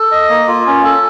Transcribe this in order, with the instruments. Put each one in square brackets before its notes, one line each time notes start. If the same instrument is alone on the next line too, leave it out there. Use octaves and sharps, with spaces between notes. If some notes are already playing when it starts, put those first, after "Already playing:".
Already playing: [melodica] A4
D#5
A#3
F4
C#4
A4